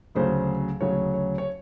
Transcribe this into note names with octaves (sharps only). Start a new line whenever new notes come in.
D2 C#3 F#3 C5
D2 C#3 F#3 C#5
C#5
C#5